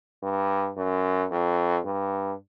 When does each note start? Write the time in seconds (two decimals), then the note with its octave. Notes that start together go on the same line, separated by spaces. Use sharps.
0.23 G2
0.77 F#2
1.31 F2
1.85 G2